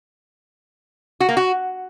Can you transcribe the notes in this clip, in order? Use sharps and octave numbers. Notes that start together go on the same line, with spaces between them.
F#4
A#3
F#4